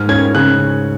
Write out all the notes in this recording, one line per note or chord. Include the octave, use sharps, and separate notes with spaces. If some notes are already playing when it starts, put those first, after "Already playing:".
Already playing: G#2 F6
C#4 G#6
C#3 F#6